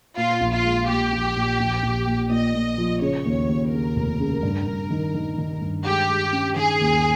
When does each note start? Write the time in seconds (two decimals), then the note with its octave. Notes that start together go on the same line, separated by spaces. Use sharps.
0.17 A#2 F4
0.41 A#1
0.52 F4
0.64 G#3
0.88 A#2 G4
1.12 A#1
1.36 A#2
1.60 A#1
1.83 A#1
2.06 A#2
2.30 A#2 D#5
2.54 A#2
2.78 F3
3.01 C#3 C#5
3.25 D#2
3.49 D#2
3.72 C#3 A#4
3.96 F1
4.20 C#3
4.43 G2
4.67 G2
4.90 D#3
5.14 D#3
5.38 D#3
5.61 G2
5.85 G#3 G4
6.09 G#3
6.32 C#4
6.56 D#3 G#4
6.81 D#2